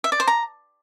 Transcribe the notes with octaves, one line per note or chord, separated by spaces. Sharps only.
E5
D5
C5
A#5